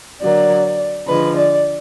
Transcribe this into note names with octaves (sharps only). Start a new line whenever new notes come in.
D3 F#3 A#3 D5
D3 F3 G#3 B4
D5